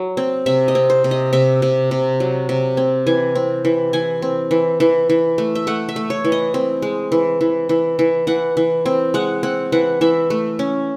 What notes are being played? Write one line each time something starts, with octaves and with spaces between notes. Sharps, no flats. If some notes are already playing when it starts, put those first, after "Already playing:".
Already playing: F#3
C4
C3 E5
D#5
C4
C5
C3
D#5
C3 E5
C3
C3
F#3
C3
C4
E3 G#5
C4
E3
E3 G#5
C4
E3
E3
E3
A3
E5
A3 F#5
E5
A3
C#5
E3
D#5
C4
G#3
E3
E3
E3
E3
E3 F#5
E3
C4
G#3 F#5
C4 F#5
E3 F#5
E3 E5
A3
C#4